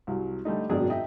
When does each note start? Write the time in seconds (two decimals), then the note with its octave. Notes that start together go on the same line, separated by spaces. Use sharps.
0.07 C2 F#3
0.45 D3 G3 A3 D#4
0.70 G#1 F#2 B2 D#3 D4 G#4
0.90 D#4 D#5 E5 G5